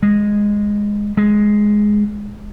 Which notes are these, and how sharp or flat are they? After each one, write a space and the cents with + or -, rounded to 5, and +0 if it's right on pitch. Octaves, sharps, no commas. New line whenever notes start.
G#3 -10
G#3 +5